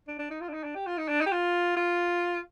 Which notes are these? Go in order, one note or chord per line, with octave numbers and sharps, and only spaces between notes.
D4
D4
D#4
F4
D4
D#4
D4
G4
F4
D#4
D4
D#4
G4
F4
F4